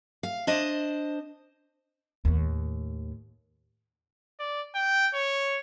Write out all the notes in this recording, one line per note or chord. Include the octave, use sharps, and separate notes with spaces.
F5
D4 C5 D#5
D#2 A2
D5
G5
C#5